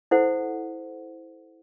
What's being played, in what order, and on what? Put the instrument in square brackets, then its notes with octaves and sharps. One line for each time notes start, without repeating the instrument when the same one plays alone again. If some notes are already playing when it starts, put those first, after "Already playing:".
[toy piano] E4 A4 C5 F#5